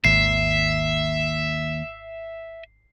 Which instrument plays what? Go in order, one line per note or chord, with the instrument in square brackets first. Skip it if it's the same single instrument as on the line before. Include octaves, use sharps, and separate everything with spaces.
[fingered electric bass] G#1 [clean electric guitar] D#2 [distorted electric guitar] E5 [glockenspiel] C7